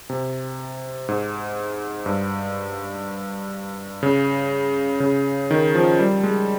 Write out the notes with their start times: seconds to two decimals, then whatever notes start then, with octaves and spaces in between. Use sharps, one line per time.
0.10 C3
1.09 G#2
2.06 G2
4.03 C#3
5.00 C#3
5.51 D#3
5.75 F3
5.99 G3
6.23 G#3